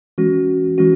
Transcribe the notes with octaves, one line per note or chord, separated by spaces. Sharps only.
E3 G#3 C#4 F#4
E3 G#3 C#4 F#4